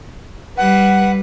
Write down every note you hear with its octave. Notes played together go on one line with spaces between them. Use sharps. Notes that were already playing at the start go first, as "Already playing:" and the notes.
G3 B4 F#5